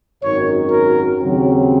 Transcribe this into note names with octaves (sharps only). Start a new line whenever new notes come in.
G#1 F#2 D#3 F#3 C#5
A#4
D#2 C#3 F#3 C4